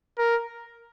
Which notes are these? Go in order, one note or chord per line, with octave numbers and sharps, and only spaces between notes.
A#4